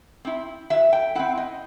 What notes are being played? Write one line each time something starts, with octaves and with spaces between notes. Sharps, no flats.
C4 E4
F#3 E5
G5
C4 E4 F#5
D#5